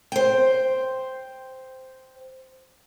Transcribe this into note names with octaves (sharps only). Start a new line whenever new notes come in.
C5 G5